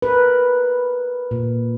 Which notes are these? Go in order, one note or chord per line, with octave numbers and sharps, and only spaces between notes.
A#4 B4
A#2